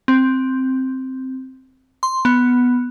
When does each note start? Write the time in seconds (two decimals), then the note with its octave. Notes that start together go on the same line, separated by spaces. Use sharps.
0.08 C4
2.03 C6
2.25 B3